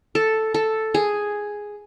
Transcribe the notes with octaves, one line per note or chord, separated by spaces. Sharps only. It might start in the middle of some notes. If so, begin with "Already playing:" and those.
A4
A4
G#4